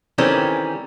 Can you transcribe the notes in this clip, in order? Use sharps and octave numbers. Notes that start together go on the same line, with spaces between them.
D#3 E3 G3 C4 C#4 A4